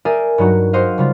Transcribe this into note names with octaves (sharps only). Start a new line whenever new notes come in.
G#4 A#4 D5 E5 G5 G#5
G2 F#3 D#4 F#4
F#4 G#4 C5 D#5 F5
C#3 G3 F4